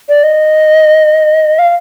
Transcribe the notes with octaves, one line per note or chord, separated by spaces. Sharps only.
D5
D#5
F5